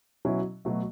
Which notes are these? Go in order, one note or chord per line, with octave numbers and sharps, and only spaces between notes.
B2 F#3 C#4 E4
B2 F#3 A3